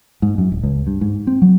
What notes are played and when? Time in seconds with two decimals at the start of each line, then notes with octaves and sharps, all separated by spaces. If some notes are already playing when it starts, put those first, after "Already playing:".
0.22 G#2
0.38 F#2
0.52 D1
0.63 C#2
0.87 G2
1.01 G#2
1.27 C4
1.42 F#3